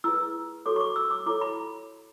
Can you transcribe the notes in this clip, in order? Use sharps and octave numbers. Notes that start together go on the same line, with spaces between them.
E4 G#4 B4 E6
F#4 A4 C#5 D6
C#6
D6
E6
D6
E4 A4 C#5 D6
B5